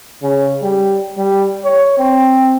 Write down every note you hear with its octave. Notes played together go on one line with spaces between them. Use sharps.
C#3
G3
G3
C#5
C4